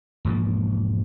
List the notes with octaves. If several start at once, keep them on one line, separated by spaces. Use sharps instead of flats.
E1 G#2 F3 A#3